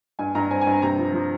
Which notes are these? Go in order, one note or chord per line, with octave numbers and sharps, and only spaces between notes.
G2 G#5
G2 A#5
C4 G#5
G#5
G2 A#5
C3 A#5
F3
F3